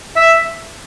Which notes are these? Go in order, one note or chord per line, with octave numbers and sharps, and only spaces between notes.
E5